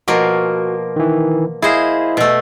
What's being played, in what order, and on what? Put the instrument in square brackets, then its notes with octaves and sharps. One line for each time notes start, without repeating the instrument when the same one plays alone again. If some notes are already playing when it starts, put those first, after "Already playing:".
[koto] B2 F3 A#3 [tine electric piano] F#4
[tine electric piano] D#3 E3
[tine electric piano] E4 D#5 F5 [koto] G#4 C5
[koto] B2 A3